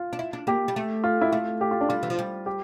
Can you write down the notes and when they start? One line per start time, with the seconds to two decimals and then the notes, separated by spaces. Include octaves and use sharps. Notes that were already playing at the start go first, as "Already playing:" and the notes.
Already playing: F4
0.13 D4
0.19 E4
0.33 D4
0.47 A#3 G4
0.68 G3
0.76 A3
1.04 F4
1.21 E4
1.32 A3 F4
1.61 G4
1.71 F4
1.81 D4
1.89 G3 F4
2.03 E3
2.10 F3
2.19 G3
2.46 G4